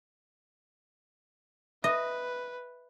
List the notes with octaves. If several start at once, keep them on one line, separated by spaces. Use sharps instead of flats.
B4 D#5 E5